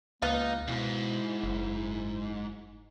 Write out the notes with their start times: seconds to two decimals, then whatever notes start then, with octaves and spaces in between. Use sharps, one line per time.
0.22 C#2 A#3 B3 D#4 F5
0.68 F2 G#2 B2 E4
1.43 F#1